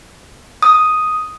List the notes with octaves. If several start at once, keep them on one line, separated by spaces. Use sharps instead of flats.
D#6